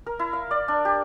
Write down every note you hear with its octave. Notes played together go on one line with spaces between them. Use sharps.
A#4
E4
F5
D5
D4
G4